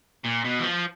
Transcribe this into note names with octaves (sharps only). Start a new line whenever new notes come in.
A#2
B2
E3
F3